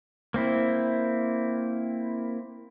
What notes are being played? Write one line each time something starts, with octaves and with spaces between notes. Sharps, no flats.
A#3 C4 E4